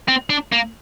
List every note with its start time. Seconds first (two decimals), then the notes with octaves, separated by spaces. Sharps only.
0.08 C4
0.30 D4
0.52 A#3